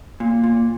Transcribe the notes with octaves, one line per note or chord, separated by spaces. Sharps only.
A#2
A#2